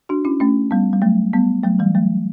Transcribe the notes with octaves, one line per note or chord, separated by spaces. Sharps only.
D4 F#4
C#4 E4
A3 C#4
G3 B3
G3
F#3 A3
G3 B3
F#3 A3
E3 G3
F#3 A3